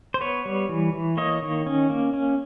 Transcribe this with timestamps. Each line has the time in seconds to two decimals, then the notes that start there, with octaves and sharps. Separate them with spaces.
0.14 C5
0.21 B3 B4 C#5
0.45 G3
0.69 E3
0.93 E3
1.17 A#3 C#5 D#5
1.42 D#3
1.66 C#4
1.90 A#3
2.14 C#4